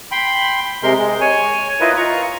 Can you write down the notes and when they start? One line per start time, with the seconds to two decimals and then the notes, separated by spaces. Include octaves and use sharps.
0.11 G5 B5 C6
0.83 C3 G#3 A#4 C6 G6
0.99 G#3
1.21 C#5 G#5
1.80 E4 F4 A#4 B4 D#5
1.97 F4 A#5 C#6